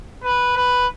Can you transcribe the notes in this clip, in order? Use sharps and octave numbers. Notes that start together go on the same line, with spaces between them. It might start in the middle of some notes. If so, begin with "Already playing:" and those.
B4
B4